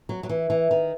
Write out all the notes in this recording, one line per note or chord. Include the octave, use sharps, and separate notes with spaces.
F#3
F#3
E3
E3
D#3